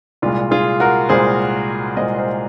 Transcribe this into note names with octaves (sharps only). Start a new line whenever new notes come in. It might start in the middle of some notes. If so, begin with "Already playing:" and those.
C2 A#2 G#3 F4
F4 G#4
F#4 A#4
C2 A#2 G#3 G#4 C5
C2 A#2 G#3 C5 D#5
C5 D#5